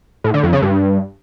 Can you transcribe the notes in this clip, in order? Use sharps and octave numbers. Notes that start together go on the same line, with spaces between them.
A2
D3
F2
C#3
G2